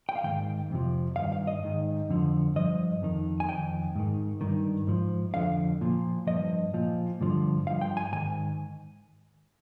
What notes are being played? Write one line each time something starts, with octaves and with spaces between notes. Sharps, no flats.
G5
F5
G#2 D#3 G5
F2 C3 F3
G2 D#3 F5
F5
D#5
G#2 D#3
F2 D3 F3
G2 F3 D#5
F2 D#3
G#5
F2 D#3 G5
G#2 D#3
G2 D#3
G#2 F3
F2 D3 F3 F5
A#2 F3
G2 F3 D#5
A#2 F3
G2 D3 F3
G2 F3 F5
G5
G#5
G#2 D#3 G#5